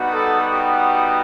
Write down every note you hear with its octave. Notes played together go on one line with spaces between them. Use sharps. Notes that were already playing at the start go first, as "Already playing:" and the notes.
Already playing: G3 B3 D#4 F#4
A4
G4